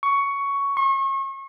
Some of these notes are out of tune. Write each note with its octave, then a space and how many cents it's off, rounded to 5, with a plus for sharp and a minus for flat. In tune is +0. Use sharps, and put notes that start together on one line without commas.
C#6 +10
C#6 -35